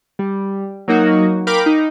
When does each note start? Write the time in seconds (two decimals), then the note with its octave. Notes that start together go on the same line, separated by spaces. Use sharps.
0.19 G3
0.88 F#3 A#3 D#4 F#4
1.47 A#4 F5 G5 B5 D6
1.66 D#4